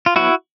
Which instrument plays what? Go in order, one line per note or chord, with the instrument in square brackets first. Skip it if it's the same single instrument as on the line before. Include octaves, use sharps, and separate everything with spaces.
[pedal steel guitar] F4
F#3 B3 E4 F#4